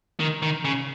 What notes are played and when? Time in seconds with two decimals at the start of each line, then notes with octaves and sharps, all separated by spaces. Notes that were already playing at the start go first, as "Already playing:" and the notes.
0.20 D#3
0.42 D#3
0.65 C#3